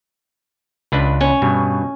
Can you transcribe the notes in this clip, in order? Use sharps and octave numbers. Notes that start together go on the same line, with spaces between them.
C#2 D4 B4
C#4
G2 B2